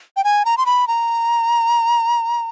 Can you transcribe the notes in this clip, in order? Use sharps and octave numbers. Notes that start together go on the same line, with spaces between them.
G5
G#5
A#5
C6
B5
A#5